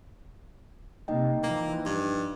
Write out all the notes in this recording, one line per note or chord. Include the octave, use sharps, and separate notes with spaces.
C3 A#3 D#4 D#5 G5
E3 F3 A#3
G2